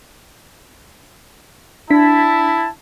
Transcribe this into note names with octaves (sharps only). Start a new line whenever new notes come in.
D4 E4 A5 B6